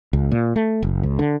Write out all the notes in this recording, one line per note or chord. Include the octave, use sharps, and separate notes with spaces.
C#2
A#2
A3
F#1
C#2
D3